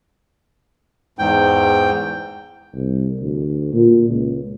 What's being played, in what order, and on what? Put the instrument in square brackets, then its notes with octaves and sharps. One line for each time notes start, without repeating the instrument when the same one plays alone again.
[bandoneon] E2 G#2 G5
[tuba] C2
D2
A#2
C#2